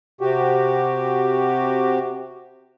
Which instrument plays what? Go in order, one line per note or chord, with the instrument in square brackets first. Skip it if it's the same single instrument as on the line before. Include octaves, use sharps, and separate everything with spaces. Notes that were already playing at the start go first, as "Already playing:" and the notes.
[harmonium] C3 F#4 G4